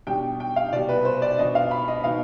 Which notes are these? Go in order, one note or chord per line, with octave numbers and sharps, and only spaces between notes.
B2 G3 D4 G5
G5
F5
C2 B2 G3 D5
B4
C5
D5
B2 B3 D4 D#5
F5
B5
D#5
B2 B3 D#4 F5